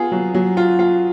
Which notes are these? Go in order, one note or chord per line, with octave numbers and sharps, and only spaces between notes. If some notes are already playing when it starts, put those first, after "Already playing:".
Already playing: B3 F4 G#4
F#3
F#3
F4
F4